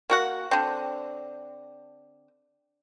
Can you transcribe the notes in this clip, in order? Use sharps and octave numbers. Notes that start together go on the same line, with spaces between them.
A#3 F#4 F#5
D3 C4